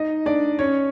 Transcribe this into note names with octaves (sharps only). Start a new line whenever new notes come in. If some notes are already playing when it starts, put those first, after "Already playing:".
Already playing: D#4 D#5
D4 D5
C#4 C#5